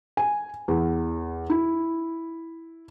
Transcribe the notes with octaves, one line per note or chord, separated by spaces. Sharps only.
G#5
E2
E4